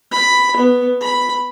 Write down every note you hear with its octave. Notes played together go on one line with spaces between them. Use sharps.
B5
B3
B5